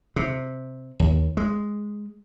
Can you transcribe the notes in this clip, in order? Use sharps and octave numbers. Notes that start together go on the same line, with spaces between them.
C3
D#2
G#3